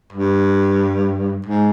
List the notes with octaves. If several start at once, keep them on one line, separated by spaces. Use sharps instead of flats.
G2
G#2